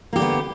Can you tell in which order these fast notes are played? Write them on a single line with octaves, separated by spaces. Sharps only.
A#3 G4 D3 B3